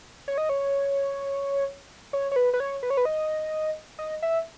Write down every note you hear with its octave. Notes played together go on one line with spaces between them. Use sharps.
C#5
D#5
C#5
C#5
C#5
B4
B4
C#5
B4
C#5
B4
D#5
D#5
E5